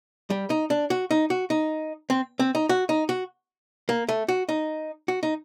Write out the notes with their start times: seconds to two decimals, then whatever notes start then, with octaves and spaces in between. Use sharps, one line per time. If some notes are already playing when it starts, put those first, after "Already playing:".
0.30 G3
0.50 D#4
0.70 D4
0.90 F#4
1.11 D#4
1.30 F#4
1.50 D#4
2.10 C4
2.39 C4
2.55 D#4
2.69 F#4
2.89 D#4
3.09 F#4
3.89 A#3
4.09 A3
4.28 F#4
4.49 D#4
5.08 F#4
5.23 D#4